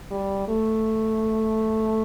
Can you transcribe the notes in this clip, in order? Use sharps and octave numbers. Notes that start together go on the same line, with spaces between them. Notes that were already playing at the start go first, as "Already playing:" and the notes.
G3
A3